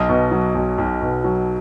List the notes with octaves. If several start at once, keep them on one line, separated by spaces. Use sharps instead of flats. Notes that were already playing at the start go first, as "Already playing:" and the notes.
Already playing: B1 D#5 D#6
B2
F#3
B1
B1
B2
F#3